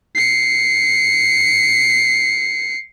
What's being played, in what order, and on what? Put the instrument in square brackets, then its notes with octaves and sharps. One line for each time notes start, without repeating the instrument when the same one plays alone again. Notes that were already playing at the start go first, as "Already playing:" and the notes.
[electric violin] C7 C#7